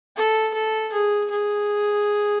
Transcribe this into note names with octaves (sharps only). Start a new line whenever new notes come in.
A4
A4
G#4
G#4